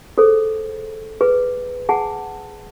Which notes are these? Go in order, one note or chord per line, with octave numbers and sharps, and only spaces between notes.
G#4 A4 C5
G#4 B4
G#4 F#5 G#5 A5